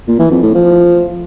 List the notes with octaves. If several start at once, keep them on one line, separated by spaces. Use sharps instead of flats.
A#2
E3
F2
A2
F3